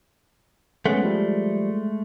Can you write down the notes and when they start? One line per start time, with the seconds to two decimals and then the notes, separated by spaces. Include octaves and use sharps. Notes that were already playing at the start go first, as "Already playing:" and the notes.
0.86 G#3 A3 B3 C#4 F#5
1.03 F3 G3